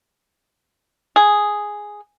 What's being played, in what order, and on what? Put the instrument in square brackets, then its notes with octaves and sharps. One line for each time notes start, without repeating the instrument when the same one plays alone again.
[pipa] G#4